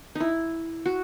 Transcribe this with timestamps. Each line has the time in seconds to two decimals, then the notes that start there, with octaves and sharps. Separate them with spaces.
0.15 D#4 E4
0.86 F#4